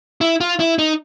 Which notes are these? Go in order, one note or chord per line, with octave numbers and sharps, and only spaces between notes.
E4
F4
E4
D#4